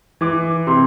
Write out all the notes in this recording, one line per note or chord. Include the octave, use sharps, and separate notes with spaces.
E3 D6
C3 C6